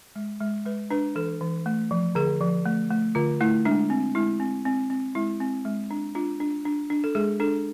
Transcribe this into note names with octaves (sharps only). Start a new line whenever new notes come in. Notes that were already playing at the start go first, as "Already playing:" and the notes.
G#3
G#3
G#3 B4
D4 B4
E3 A4
E3
A3
F3
D3 G#4
F3
A3
A3
D3 F4
A3 E4
G#3 D4
C4
G#3 E4
C4
C4
C4
G#3 E4
C4
G#3
D4
D4 F4
D4
D4
D4
A4
G#3 G#4
D4 A4